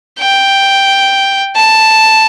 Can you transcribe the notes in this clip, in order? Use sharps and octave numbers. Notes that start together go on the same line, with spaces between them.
G5
A5